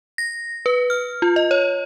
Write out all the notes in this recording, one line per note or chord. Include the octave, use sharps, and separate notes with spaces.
A#6
B4
F6
F4
D#5
C#5